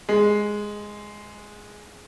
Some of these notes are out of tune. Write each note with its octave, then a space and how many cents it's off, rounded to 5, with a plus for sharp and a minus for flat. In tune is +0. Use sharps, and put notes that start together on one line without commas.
G#3 +0